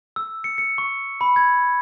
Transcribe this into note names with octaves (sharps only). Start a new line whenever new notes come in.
E6
C#7
C#7
C#6
B5
G#6